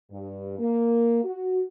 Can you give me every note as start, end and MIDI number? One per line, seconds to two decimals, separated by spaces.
0.11 0.58 43
0.59 1.19 58
1.23 1.62 66